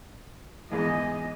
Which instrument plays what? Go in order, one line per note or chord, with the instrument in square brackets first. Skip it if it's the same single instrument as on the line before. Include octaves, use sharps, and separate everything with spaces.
[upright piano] E2 G#2 E3 [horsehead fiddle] D#5